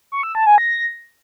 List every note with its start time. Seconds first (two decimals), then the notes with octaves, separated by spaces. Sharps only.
0.12 C#6
0.23 E6
0.35 A5
0.46 G#5
0.58 A#6